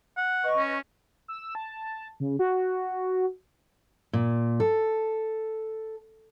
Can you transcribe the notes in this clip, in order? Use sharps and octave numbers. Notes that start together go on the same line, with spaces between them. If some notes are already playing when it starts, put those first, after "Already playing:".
F#5
B4 D#5 C#6
C#4
E6
A5
C#3
F#4
A#2
A4